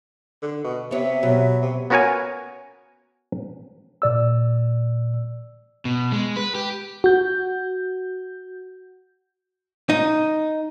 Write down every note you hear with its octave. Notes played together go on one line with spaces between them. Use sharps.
D3
B2
C3 B3 C#5 E5
B2 F#3
C3
B3 C#4 F#4 A#4 C#5 G#5
A#2 D5 E6
B2
G#3
B4
G4
F#4 G6
D#4